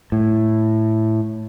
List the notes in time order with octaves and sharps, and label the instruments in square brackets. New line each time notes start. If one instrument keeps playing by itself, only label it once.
[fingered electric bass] A2